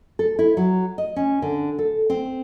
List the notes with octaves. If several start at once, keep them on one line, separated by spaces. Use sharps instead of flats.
A4
E4
F#3
D#5
C#4
D3
A4
C4